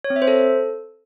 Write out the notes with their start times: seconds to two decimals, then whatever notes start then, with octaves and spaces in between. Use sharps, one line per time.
0.04 C#5
0.10 C4
0.16 E5
0.22 C5
0.28 A4